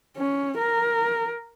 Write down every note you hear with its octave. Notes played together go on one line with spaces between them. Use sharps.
C#4
A#4